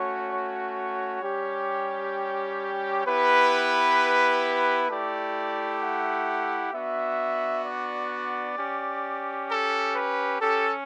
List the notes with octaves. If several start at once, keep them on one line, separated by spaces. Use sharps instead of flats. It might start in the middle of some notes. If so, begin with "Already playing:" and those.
Already playing: A3 C#4 F#4 C#5
C#5
G3 C#4 G4
B3 E4 G4 B4
A3 E4 G4 D5
F#5
B3 D4 F#4 E5
D5
C#4 G4
A4
B4
C#4 G4 A4